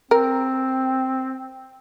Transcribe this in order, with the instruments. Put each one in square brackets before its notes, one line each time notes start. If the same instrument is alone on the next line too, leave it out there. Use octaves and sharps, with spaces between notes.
[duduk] C4 [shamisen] A#4